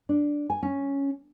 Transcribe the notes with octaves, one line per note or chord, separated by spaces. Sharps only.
D4
G#5
C#4